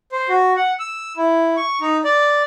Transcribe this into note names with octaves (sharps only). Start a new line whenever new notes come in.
C5
F#4
F#5
E6
E4
C#6
D#4
D5